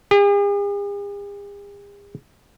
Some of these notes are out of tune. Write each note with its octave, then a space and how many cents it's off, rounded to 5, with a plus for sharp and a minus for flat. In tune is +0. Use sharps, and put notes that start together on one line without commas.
G#4 -45